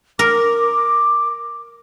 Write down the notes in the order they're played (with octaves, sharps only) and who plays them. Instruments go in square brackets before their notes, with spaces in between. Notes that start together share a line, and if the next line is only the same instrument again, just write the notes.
[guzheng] A#4 [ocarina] D6